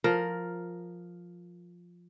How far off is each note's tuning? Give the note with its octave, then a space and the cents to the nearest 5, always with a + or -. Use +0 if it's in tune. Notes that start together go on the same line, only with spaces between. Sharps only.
F3 +5 A#4 +0